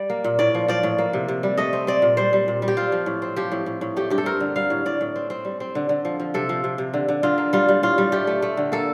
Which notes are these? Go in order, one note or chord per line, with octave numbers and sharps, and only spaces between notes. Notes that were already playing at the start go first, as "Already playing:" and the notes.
Already playing: G3 D5
A#3
A#2
A2 D5
F3
F3 D5
A2
A#3
C3
C3
G3
A3 D#5
C4
C4 D5
A#2
G3 C5
G3
A#2
G3
G4
C4 F4
F3
A2
C4
F3 G4
A2
A2
A2
A3 G4
G2 G4
A4
C4 A#4
D3
G3 F5
A2
A2 D5
A2
C4
C4
G3
C4
D3
D3
F3
F3
C3 A4
F3
C3
C3
D3
D3
D3 F4
A#3
G3 F4
G3
A2 F4
G3
A3 G4
A3
A3
D3
A#3 A4